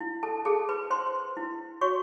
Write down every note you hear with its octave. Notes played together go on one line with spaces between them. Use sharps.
E4
A4 A5
G#4 A4 A5
B4 B5
C5 C6
E4
F#4 C#5 C#6